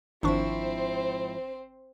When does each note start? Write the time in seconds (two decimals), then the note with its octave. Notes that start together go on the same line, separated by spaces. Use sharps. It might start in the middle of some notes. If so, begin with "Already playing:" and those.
0.23 G#1 G#2 F3 C4 D4 E4 C5 C#6